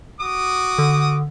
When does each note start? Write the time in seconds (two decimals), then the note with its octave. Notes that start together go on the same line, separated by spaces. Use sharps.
0.21 F#4 D6 D#6
0.78 D3